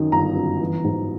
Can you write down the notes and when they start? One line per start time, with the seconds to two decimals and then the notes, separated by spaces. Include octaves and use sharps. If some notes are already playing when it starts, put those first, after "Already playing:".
Already playing: F#2 D#3
0.12 G1 A#5
0.36 F#2
0.60 E3
0.84 G#2